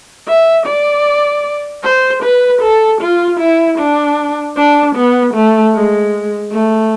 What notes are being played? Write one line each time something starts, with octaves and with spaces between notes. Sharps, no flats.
E5
D5
C5
B4
A4
F4
E4
D4
D4
B3
A3
G#3
A3